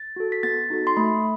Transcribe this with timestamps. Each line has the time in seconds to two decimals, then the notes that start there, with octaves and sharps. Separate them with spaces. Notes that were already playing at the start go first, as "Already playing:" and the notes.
Already playing: A6
0.16 F#4 A4
0.32 B6
0.43 B3 A6
0.70 D#4 F#4 A4
0.87 C6
0.97 A3 B5